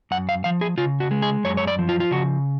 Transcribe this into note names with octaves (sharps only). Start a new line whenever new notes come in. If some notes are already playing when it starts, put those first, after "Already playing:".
F#2 F#5
F5
F3 F5
G#4
C#3 F4
F#4
G#3
G#4
F#2 C#5
C#5
D5
F3
F4
F4
C#3 F#4